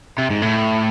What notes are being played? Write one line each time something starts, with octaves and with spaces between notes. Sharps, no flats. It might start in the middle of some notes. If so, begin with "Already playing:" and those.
C3
G#2
A2